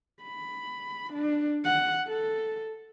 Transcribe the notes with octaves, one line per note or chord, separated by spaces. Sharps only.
B5
D4
F#5
A4